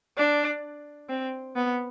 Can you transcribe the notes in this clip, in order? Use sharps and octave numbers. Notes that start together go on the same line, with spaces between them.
D4
C4
B3